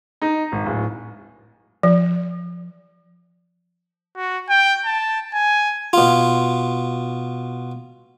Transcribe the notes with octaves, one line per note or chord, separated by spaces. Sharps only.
D#4
G#1
D1
F3
F#4
G5
A5
G#5
B2 F4